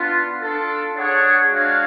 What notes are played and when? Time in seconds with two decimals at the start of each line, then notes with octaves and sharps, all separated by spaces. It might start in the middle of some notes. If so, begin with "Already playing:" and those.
Already playing: B3 D4 F4
0.40 D4 F4 A4
0.94 D4 G#4 C#5 F#5
1.49 G#3 D4 F#4 C#5 F5